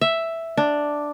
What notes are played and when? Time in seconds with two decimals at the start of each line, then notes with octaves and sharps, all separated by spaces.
0.01 E5
0.57 D4